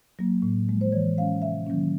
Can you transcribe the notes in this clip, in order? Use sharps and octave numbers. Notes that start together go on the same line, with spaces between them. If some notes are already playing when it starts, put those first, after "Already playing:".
F#3 A#3
A2
F3 G#3
C5
E3 C#5
G#3 C#4 F5
C3 E5
D#3 F#3 A#3 C#4